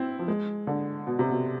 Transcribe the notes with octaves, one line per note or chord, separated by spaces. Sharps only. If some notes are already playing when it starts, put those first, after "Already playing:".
Already playing: C4 E4
F3
G#3
D3
B2
C3
B2